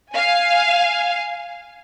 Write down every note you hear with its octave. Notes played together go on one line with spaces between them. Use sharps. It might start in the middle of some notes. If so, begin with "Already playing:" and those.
F5 G#5